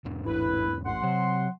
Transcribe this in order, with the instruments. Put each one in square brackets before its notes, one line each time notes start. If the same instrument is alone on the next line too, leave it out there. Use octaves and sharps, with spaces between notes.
[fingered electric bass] E2 G#2 D4
[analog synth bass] A1 [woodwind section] E4 B4
[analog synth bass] A1 [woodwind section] F#5 C6
[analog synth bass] C3 [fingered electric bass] F#3